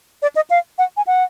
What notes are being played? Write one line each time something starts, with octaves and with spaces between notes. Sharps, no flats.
D5
D#5
F5
F#5
G#5
F#5